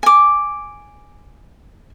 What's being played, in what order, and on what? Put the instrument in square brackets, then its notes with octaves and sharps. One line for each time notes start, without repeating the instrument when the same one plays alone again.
[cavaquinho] G#5 D6